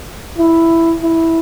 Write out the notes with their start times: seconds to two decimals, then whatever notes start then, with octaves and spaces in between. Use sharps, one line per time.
0.38 E4
1.02 E4